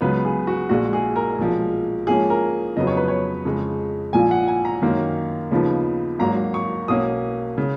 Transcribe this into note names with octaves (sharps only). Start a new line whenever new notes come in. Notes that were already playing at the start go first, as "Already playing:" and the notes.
C#2 C#3 F#3 B3 B4
G#4
F#4
A#1 A#2 G#3 F#4
G#4
A#4
B1 A#2 F3 G#3
G#2 F3 A#3 C#4 G#4
A#4
F2 C#3 F#3 B3 D#5
C#5
B4
C#5
F2 C#3 G#3
A#1 A#2 F3 G#5
F#5
G#5
A#5
F#2 D#3 A#3 C#4
D#2 C#3 F3 B3 D#4
G#1 G#2 F#3 A#3 A#5
C#6
B1 B2 A#3 C#4 D#6
C#3